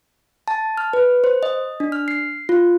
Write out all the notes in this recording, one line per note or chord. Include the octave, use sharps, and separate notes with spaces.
A5
F6
B4
C5
D#5
D4
F6
C7
F4